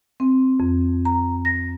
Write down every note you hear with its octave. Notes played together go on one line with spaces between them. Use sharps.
C4
F2
A#5
A#6